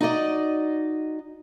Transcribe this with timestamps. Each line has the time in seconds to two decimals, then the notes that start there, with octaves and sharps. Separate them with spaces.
0.01 D#4 F#4 D5 D#5